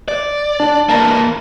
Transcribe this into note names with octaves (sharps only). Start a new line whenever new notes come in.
D5
D4 A5
E3 A#3 A5 A#5